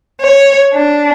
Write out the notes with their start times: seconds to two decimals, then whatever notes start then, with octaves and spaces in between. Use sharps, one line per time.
0.21 C#5
0.74 D4